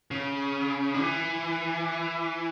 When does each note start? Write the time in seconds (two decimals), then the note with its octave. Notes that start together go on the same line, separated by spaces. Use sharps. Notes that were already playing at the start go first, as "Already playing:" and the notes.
0.11 C#3
0.94 D3
1.01 E3